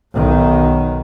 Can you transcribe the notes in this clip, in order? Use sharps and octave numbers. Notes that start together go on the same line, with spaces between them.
B1 D#3